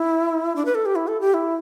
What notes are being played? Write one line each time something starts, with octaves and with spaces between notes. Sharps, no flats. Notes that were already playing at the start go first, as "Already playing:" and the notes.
Already playing: E4
D4
B4
A4
G4
E4
A4
G4
E4